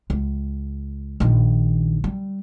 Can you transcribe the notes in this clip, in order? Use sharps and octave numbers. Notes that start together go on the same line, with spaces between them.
C#2
A#1 D#3
G3